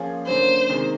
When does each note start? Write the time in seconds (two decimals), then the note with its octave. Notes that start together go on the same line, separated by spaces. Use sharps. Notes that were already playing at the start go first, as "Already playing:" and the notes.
Already playing: F3 A#3 C#4 F4 G#4
0.26 D3 F#3 A#3 C#4 C5
0.69 C3 D#3 G#3